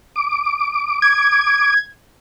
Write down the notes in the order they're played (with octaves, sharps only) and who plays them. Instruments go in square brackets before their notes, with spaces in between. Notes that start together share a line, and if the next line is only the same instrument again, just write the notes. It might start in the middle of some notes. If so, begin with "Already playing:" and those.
[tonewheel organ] D6
[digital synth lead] G#6